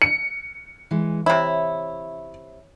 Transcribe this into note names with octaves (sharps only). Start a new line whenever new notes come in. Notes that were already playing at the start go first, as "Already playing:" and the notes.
C#7
E3 G#3
C3 E4 C#5